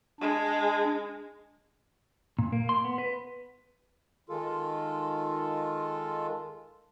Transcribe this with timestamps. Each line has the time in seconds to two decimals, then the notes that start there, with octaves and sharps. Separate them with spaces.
0.21 G#3 D4
2.39 A#2
2.52 A#3
2.69 C6
2.85 B3
2.98 B4
4.29 D#3 G#3 F4 A4